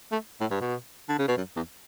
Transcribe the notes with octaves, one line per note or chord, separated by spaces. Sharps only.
A3
A2
G2
B2
D3
C#3
B2
F#2
E2